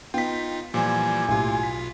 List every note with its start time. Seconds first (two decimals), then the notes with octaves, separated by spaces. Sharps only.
0.14 B3 D#4 F4 G5 B6
0.74 A#2 E3 F3 G3 G#5
1.28 B1 A2 G3 F4
1.63 B6